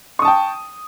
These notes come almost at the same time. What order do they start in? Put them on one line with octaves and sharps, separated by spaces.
C#6 D#6 A5 G5